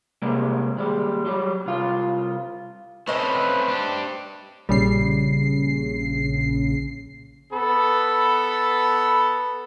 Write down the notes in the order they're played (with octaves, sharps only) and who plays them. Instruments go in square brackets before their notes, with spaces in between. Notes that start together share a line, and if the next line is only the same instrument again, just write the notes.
[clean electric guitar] C3 G3 G#3 A#3
D#2 G3 G#3
F#3 G3
C2 F4
[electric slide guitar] A3 C4 C#4 [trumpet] B4 [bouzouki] C5 D#5
[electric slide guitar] D4 G4
[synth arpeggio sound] A#1 C#3 C7 [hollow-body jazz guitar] G3
[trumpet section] B3 A4 B5